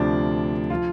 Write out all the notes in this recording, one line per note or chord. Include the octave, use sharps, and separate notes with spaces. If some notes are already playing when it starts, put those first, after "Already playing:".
Already playing: D2 C3 F3 D4
F3 F4